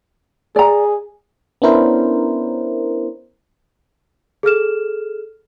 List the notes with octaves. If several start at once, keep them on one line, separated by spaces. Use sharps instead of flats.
G#4 D5 A#5
B3 C#4 D4 E4 A#4 C5
G#4 A4 F6 E7